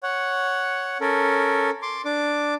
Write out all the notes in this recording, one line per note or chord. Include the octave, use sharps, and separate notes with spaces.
C#5 F#5
C#4 A4 A#4
C6 D6
D4 D6